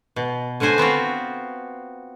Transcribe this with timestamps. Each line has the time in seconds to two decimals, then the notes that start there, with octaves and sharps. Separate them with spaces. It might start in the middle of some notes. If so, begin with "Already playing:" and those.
0.16 B2
0.60 D3 C#4 F#4 C5 G#5
0.78 B3 C4 F4 F#4